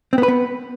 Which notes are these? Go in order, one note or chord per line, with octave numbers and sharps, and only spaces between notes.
C4
B3
B4
B3